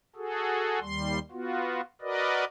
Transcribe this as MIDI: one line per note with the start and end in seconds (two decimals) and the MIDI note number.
0.16 0.80 66
0.16 0.80 68
0.16 0.80 69
0.80 1.19 39
0.80 1.19 55
0.80 1.19 84
1.31 1.81 59
1.31 1.81 65
1.31 1.81 66
2.02 2.45 66
2.02 2.45 70
2.02 2.45 71
2.02 2.45 74
2.02 2.45 75